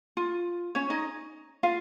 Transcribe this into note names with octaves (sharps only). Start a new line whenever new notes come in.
F4
C#4 C#5
D#4 D#5
F4 F5